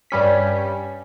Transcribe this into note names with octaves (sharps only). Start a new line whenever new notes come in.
G2 G3 C#4 B6